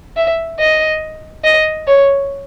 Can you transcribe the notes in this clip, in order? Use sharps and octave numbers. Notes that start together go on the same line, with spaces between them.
E5
D#5
D#5
C#5